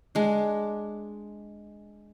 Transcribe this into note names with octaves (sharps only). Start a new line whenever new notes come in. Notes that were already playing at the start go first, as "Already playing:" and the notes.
G#3 D4